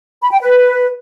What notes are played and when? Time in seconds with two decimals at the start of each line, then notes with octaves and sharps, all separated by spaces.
0.22 B5
0.31 G5
0.40 B4